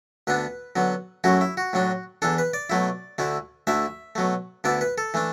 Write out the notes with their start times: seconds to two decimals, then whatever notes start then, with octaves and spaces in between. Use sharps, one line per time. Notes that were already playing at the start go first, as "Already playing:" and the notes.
0.27 D2 D3 B3 D4 B4
0.76 D3 F#3 B3
1.24 F#2 F#3 A3 E4 F#4
1.41 E4
1.57 F#4
1.73 A2 F#3 D4
2.22 E2 E3 D4 A4
2.38 B4
2.54 D5
2.70 B2 F#3 A3 E4
3.18 D2 D3 A3 E4
3.67 D2 D3 A3 E4 E5
4.15 B2 F#3 A3
4.64 D2 D3 B3 E4 D5
4.81 B4
4.98 A4
5.14 E3 A3 D4